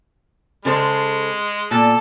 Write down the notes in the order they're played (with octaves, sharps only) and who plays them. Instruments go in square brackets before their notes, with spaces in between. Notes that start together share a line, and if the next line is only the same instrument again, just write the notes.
[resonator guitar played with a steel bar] C#3 A4 C5 [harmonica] G#3
[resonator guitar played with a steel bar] A#2 [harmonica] A4